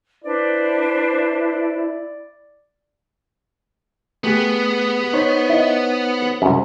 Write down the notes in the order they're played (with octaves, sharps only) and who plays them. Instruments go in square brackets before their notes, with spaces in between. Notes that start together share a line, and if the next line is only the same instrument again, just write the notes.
[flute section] D4 B4 C5 [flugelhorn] E4 [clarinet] D5
[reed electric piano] A3 G4 G#4 [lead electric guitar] B3
[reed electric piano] D#4 C5 C#5
[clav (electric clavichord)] E4 D#5
C2 F#2